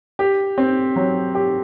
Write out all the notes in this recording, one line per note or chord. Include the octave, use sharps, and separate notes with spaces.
G4
C4
F#3
G4